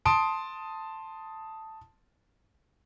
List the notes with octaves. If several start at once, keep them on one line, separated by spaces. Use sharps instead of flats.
A5 C6 D#6 D7